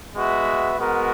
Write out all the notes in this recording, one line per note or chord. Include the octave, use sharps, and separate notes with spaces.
G#3 B3 F#4 B4 E5
G#3 B3 F#4 A#4